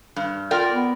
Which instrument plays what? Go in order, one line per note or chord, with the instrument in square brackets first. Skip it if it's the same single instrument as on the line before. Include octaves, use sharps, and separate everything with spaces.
[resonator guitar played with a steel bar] G2
[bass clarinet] F4 [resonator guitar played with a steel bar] A#4 D5 G5
[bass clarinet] B3